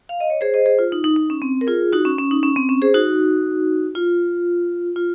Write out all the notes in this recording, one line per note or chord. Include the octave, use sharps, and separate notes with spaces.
F5
D#5
C#5
G#4 C5
C5 D#5
G#4 C5
F4
D#4
D#4
D#4
C#4
C4
A#4
F4 G#4
D#4 F#4
C#4
C#4
D#4
C#4
C4
C#4
G#4 C5
D#4 F#4
F4
F4